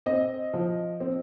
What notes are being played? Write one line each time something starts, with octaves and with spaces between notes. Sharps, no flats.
C4 D#5
F3
C4